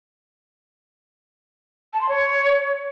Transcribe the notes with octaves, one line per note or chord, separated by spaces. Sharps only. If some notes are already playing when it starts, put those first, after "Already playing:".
A5
C6
C#5